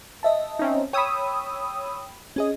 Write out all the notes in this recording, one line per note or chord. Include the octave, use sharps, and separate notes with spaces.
D#5 E5 A5
C4 C#4 D#4
C#5 G5 B5 D#6 E6
C#4 G#4 D#5